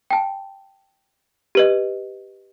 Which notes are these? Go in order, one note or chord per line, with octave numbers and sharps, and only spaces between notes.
G5 A5
G4 B4 D#5